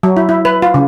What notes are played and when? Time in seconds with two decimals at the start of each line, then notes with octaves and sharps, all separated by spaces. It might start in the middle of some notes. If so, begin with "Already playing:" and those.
0.03 F#3
0.17 E4
0.29 E4
0.45 B4
0.62 F4
0.74 C#3